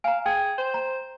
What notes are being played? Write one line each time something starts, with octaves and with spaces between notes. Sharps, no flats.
F5 G#5 A#5
G#4 G5
C5
A#5